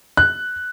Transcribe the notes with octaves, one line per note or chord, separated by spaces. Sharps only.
F#6